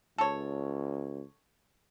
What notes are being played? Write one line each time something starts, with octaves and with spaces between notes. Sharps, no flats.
C#2 A4 C#5